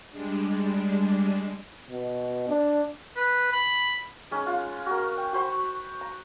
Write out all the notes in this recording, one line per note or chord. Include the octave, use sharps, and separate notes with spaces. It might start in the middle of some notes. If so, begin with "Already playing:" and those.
G3 G#3 D4
B2
D4
B4
B5
G#3 C#4 D#4
F4 F#5
F#4 A#4
G5
F#4 C5 B5 C#6
A#5